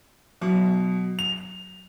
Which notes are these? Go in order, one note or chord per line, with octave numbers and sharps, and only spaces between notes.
B2 F#3
F7